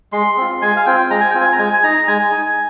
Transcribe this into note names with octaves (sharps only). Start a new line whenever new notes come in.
G#3 C6
C4 F4
G#3 G#5
F5
C4 F4 G5
G#3 A#5
G#5
C4 F4 G5
G#5
A#5
G#3 G#5
G#5
D#4 A#5
G#3 G#5
D#4